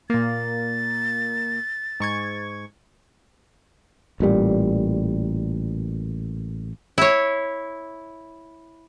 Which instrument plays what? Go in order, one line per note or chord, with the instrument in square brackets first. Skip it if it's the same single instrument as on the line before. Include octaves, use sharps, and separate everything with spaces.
[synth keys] A#2 A#3 [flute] A6
[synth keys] G#2 C#6 G#6
[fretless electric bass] A1 A#2 G3
[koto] E4 C#5